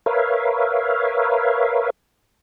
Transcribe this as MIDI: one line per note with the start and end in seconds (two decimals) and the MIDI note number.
0.06 1.90 70
0.06 1.90 71
0.06 1.90 73
0.06 1.90 76
0.06 1.90 77